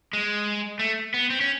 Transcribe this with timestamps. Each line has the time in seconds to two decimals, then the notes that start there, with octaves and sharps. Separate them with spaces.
0.13 G#3
0.79 A3
1.14 B3
1.30 C4
1.41 C#4